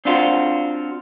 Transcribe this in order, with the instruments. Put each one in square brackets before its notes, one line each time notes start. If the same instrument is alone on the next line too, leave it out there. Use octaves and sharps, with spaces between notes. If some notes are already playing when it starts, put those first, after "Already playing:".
[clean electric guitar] C4 D4 F4 F#4 C5